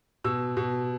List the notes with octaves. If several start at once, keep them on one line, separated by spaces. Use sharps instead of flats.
B2 E6
B2